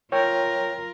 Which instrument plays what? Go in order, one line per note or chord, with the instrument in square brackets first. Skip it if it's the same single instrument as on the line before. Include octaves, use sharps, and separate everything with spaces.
[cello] F4 A#4 [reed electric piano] C#5 G5